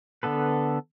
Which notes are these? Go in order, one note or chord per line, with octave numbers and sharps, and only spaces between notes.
D3 B3 A4 B4